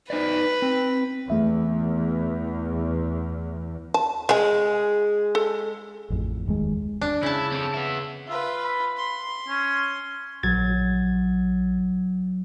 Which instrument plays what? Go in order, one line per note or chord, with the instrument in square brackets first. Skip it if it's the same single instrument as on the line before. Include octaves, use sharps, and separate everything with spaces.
[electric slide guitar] D#4 C5 D5 [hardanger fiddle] B4
[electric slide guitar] C4
[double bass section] E2 [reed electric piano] A3 E5
[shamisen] A5
[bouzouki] G#3 [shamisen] E5 G#5
[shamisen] A4
[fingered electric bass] A1 F2
F1 D#2 B2 G#3
[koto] D4
[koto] C#3 A5 [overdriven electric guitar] E4
[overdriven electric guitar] C4 A4
B3 E4
[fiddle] F4 B4 [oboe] E5
[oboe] B5
[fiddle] C6
[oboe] C#4
[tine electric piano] A#1 G#6 A6 [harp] F#3